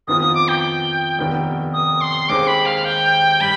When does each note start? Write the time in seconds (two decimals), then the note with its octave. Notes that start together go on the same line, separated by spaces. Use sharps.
0.07 F2 D#3 B3 F4 D#6
0.21 D#6
0.35 D6
0.48 G5
1.18 F1 D#2 D#3 B3
1.73 D#6
2.01 C6
2.29 D#2 D#3 G#3 C4 D6
2.47 B5
2.66 F5
2.85 G5
3.40 G3 B5